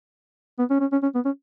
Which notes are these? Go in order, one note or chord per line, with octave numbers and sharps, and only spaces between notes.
B3
C#4
C#4
C#4
C#4
B3
C#4